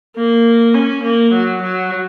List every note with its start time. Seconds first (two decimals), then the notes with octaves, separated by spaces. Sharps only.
0.16 A#3
0.75 C#4
1.03 A#3
1.33 F#3
1.62 F#3